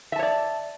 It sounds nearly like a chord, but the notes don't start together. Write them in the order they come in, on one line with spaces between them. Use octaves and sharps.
E5 A5 C#5 D5